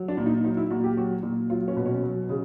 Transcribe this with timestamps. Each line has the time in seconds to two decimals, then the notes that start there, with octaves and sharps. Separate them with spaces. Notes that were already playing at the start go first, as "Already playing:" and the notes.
Already playing: F#3
0.08 D4
0.17 A#2
0.26 D#4
0.44 F#3 D#4
0.57 E4
0.70 A#2 F#4
0.84 G4
0.97 F#3 F#4
1.23 A#2
1.50 F#3 F4
1.68 C#4
1.76 B2
1.86 C#4
2.03 F#3
2.29 C#3